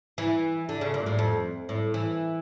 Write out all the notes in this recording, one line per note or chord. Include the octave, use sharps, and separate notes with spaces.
E3
D3
C#3
A#2
A2
F2
A2
E3